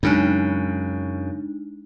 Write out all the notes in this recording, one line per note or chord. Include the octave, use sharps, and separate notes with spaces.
F#2 C#3 G#3 D4 D#4